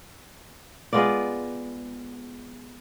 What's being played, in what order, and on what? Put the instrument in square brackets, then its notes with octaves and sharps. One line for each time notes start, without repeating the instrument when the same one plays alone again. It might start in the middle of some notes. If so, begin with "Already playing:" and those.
[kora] G#3 B3 F4 D5